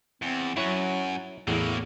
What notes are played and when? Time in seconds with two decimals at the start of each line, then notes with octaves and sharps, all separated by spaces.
0.22 E2 C4
0.57 F#2 F#3 E4 C#5 F#5
1.48 E2 A2 F#3 A#3 E4 G#4